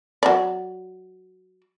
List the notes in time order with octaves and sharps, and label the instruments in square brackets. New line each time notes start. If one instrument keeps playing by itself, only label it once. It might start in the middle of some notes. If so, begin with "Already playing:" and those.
[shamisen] F#3 D5